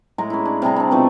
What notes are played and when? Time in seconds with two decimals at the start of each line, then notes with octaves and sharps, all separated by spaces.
0.18 A2 G#3 A#5
0.30 C#4 E4
0.45 D4
0.62 C3 G3 G#4 A#5
0.76 C4 D4
0.91 B2 F3 A3 D#4